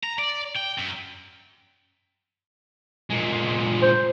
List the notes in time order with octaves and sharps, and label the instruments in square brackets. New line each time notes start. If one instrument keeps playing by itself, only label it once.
[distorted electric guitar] A#5
D5
G5
F#2
A#2 G#3
[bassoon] C5